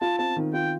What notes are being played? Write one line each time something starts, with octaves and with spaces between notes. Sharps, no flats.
F4 A5
C4 A5
D#3
F4 G5